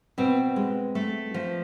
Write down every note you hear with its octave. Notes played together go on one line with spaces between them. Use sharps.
B2 C4
G#3
A3
F3